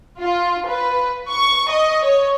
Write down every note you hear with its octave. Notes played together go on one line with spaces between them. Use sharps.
F4
B4
C#6
D#5
C#5